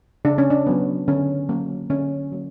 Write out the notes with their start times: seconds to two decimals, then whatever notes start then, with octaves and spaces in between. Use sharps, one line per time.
0.25 C#3 D4
0.38 C#4
0.50 D4
0.67 F#3 B3
1.08 D3 C#4
1.49 F#3 A#3 C#4
1.90 D3 C#4
2.32 F#3 A#3